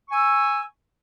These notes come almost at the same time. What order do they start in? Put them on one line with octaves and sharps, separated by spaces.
C#6 G#5 E6